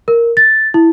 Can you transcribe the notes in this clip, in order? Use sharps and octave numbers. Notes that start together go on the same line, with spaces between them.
A#4
A6
E4